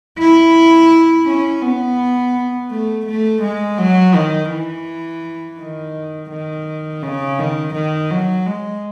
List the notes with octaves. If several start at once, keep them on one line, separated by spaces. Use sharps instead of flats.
E4
C#4
B3
A3
A3
G#3
F#3
D#3
E3
D#3
D#3
C#3
D#3
D#3
F#3
G#3